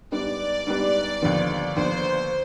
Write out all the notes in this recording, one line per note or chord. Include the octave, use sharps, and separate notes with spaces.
G#2 G3 B3 D4 D5
G#2 G3 B3 D4
D#2 D3 F3 B3
D#2 D3 F3 B3 C5